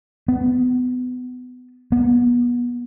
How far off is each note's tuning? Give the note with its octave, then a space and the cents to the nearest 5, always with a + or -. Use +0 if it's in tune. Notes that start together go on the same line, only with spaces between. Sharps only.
B3 +25
B3 -30